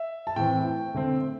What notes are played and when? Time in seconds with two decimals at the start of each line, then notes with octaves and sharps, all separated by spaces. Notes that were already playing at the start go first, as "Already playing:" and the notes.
Already playing: E5
0.27 A5
0.36 A2 E3 C4 G5
0.94 D3 A3 C4